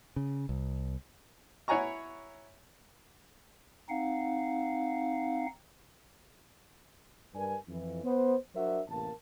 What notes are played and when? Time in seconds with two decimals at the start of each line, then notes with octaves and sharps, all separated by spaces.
0.16 C#3
0.49 C2
1.68 E4 C#5 F#5 G#5 A#5 C#6
3.89 C4 D#4 F5 F#5
7.34 G2 G3 D4 A#4 B4 G#5
7.68 F2 E3
8.04 B3 C5
8.55 F#3 D4 F#4 A#4 C5 E5
8.89 A1 C3 A#3 A#4 A5